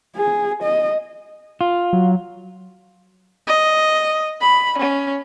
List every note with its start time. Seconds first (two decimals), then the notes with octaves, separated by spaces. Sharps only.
0.17 G#4
0.62 D#5
1.61 F4
1.93 F#3
3.47 D#5
4.41 B5
4.78 C#4